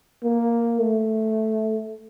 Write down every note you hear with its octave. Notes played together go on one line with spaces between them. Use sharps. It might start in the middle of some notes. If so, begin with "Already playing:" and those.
A#3
A3